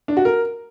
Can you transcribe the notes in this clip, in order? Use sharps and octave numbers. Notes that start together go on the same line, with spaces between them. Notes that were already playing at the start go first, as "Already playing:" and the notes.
D4
F#4
A#4